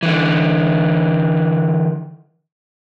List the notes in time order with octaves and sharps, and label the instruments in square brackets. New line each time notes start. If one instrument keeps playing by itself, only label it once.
[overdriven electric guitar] D3 E3